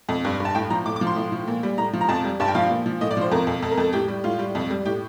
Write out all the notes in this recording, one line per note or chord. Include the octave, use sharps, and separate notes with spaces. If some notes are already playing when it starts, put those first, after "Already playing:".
F2
G2
G2
A5
A2 G5
F3 A#5
A2 D6
D6
F3
C6
A2
F3
A#2
G3
A2 A#5
F3
A#5
F2 A5
G3
G2 A5
G5
F3 F5
A#2
F3
A2 D#5
D5
F3 C5
F2 A#4
F2
F2 A4
A#4
F2 A4
A2 G4
G3
A2 F4
G3
F2
G3
A2 G4